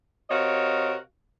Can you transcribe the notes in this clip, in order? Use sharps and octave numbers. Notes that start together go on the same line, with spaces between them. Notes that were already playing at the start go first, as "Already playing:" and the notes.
C3 F#4 A#4 C#5 D#5 F5